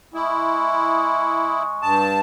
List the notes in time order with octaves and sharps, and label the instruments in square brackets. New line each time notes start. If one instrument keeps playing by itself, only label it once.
[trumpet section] G#3 C#6 D#6 [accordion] E4
[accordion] G2 A5